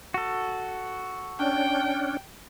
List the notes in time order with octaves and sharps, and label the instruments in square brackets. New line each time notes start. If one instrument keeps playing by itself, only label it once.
[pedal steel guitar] F#4 A4
[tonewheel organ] C#4 D4 [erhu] G5